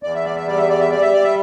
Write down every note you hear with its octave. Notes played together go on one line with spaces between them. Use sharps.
E2 D5
E5
D5
E5
G3 D5
E5
D5
E5
G3 D5
E5
D5
E5